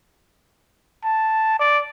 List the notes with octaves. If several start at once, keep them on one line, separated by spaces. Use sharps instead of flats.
A5
D5